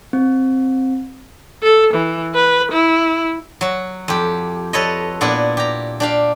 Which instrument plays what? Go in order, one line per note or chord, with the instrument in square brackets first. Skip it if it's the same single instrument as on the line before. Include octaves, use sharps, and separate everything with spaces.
[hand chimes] C4
[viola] A4
E3
B4
E4
[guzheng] F#3 F#4
F2 G4
A4 B4 C#5 D#5
A#2 B3 D4 E4
G4 A#5
D4 G4 F5